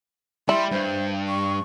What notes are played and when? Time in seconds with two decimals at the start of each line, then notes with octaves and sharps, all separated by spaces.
0.49 G3 E4 C6
0.72 G2 C5
1.28 C#6